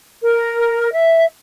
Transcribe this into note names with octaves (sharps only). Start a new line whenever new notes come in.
A#4
E5